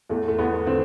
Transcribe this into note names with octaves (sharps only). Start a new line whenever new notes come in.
E2 A3
A3
E2 B3
D3 C4